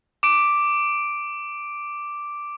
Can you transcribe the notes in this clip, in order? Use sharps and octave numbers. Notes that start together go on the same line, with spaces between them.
D6 D7